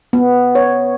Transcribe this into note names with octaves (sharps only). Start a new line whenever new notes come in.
B3
C#5